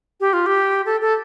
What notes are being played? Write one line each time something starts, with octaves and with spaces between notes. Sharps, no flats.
G4
F4
G4
A4
A4